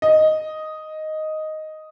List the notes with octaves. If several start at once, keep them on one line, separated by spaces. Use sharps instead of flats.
D#5